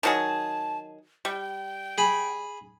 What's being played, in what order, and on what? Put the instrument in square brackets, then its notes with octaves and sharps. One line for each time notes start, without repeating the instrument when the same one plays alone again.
[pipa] D#3 F#3 G#4 [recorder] A5
[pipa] G3 [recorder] G5
[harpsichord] G#4 B5